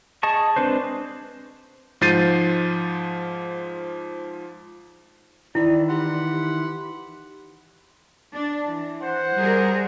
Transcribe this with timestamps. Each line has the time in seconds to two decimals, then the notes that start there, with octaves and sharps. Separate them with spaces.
0.23 G#4 D#5 A5 C#6
0.56 G#3 C4 D4 B4 C5
2.01 G#2 F3 G6 A6 C7 D#7
5.55 D#3 E3 E4 D5
5.89 G4 F#5 B5 C6
8.33 D4
8.67 E3
9.00 C5 F#5
9.37 G3 G#4 A#4